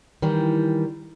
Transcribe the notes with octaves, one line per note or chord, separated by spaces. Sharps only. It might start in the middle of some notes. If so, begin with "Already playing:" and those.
D#3 E3 G3